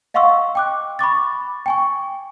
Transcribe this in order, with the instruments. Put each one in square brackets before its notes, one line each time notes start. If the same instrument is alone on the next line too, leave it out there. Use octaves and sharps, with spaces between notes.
[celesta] D#5 F5 F#5 C6 C#6 E6
G5 D6 F#6
B5 C#6 D6 A6
G5 G#5 C#6